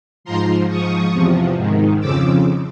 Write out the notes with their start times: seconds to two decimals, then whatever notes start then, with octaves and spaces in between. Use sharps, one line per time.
0.24 G#2 F3 A#5 C6
0.68 G#2 F3 C#6 D#6
1.13 E2 C3 F3
1.56 G#2 D#3
2.00 F2 C#3 F3 D6 E6